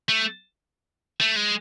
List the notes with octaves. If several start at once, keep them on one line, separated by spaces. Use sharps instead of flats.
A3
A3
G#3